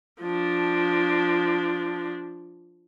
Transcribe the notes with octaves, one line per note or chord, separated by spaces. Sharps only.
F3 D4